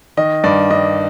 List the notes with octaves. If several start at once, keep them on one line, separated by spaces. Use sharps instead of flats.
D#3 D#5
G2 D5
G2 D#5